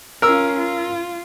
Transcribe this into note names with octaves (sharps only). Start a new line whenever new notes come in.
C#4 F4 A#4 E6
F4